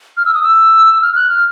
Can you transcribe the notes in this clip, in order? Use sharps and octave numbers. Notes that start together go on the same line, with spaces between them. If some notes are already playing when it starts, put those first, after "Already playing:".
F6
E6
D#6
E6
F6
F#6
F6